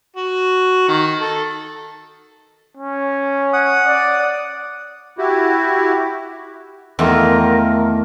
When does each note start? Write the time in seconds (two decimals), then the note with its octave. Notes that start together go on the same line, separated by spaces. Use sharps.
0.16 F#4
0.88 D#3
1.21 A4
2.77 C#4
3.53 F#5 D#6
3.86 D5
5.18 E4 F#4 G4
6.99 E2 D#3 A3 F4 A4 A#4